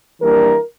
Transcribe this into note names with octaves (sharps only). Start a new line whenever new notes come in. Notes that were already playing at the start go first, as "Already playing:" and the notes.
E3 G3 A#3 D4 A#4